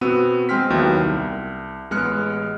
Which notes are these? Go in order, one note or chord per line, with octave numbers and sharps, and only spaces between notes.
B2 B3 C4 F#4 E6 D#7
G#3 C4 G5 C6 F6 B6
D#2 F#3 B3 E4 G5 G6
C2
A1 G#3 B3 F6 F#6 C#7